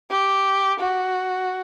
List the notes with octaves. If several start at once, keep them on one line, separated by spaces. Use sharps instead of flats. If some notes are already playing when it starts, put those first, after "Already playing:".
G4
F#4